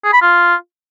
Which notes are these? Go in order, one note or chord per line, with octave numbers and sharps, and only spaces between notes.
G#4
B5
F4